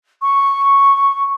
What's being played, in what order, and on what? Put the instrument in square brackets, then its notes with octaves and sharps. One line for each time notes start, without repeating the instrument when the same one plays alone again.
[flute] C#6